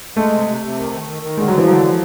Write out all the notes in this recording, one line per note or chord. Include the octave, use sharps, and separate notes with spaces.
G#3 A3
C3
C3
C3
D#3
D#3
D#3
D#3
D3 G#3
F#3
E3 F3
D3 F#3
F3